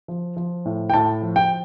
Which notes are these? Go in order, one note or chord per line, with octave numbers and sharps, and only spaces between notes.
F3
F3
A2
G5
A2 A5
F3
G5